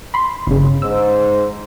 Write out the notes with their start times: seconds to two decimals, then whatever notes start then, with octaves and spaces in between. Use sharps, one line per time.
0.14 B5 C6
0.47 G1 C#3
0.82 G#2 C5 E6